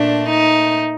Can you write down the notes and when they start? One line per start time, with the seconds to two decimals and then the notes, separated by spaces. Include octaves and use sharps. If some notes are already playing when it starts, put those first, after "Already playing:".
Already playing: A#2 A3 D4
0.29 D#4